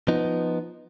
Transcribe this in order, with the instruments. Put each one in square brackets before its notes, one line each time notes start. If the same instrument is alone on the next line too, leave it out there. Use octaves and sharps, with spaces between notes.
[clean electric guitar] F3 B3 D#4